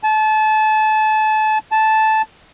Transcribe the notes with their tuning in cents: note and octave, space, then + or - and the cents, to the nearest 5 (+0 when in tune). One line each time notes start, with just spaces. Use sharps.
A5 -30
A5 -10